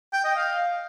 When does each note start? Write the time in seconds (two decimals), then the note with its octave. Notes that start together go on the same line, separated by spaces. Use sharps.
0.13 G5
0.24 D#5
0.36 F5